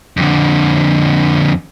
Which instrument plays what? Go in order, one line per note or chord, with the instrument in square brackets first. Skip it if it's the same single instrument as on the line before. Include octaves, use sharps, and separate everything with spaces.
[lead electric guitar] F2 D3